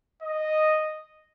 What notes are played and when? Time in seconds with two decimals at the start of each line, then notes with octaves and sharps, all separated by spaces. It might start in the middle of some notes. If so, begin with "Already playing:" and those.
0.22 D#5